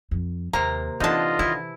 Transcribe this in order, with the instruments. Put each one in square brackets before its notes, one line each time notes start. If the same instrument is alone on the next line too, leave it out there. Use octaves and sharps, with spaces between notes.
[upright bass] F2
[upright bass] D#2 [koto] C3 A#3 [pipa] A#5
[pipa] D3 D#4 [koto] E3 A5 [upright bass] C4 [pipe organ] F4 D#5
[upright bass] D#3 [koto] E4